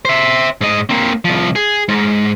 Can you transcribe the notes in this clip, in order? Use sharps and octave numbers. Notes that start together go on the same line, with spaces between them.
C5 E5
G#2 D#5
A#3 C4
C2 F3
G#4
G#2